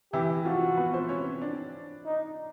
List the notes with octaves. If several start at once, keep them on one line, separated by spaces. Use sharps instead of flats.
E3 E4 G4
F3 F4 F#4
B3 B4
C4 C5
C#4 C#5
D4 D5
D#4